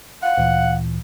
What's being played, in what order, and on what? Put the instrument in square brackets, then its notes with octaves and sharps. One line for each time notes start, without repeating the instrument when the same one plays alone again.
[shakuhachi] F5 [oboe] F#5
[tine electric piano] D2 A#2 E3